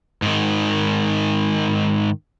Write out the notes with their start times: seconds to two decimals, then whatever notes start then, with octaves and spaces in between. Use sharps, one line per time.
0.22 G#2 D#3